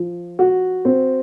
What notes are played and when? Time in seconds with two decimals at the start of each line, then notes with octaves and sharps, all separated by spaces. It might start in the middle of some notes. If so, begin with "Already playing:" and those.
Already playing: F3
0.39 F#4
0.85 C4